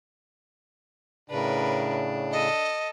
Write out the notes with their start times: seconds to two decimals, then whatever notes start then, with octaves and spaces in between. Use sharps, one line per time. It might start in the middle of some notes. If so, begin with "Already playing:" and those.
1.30 A2 C#3 D4 A#4 B4
2.32 A4 D#5